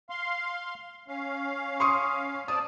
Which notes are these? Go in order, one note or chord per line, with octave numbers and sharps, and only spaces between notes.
F5 C6
C#4 F5
C6 C#6 D#6
C4 D5 A5 D#6